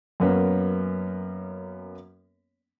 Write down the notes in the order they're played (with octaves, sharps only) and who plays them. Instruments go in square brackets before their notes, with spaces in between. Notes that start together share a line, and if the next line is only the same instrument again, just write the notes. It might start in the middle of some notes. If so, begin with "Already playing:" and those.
[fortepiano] F#2 A#3 B3 C#4